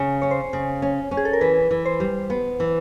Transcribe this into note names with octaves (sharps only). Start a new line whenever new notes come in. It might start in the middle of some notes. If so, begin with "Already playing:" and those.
Already playing: C#3 C#5
C#4 C#5
C5
C#3
C#4
C#4
G#4
A4
A#4
E3 B4
E3
C5
G3
B3
E3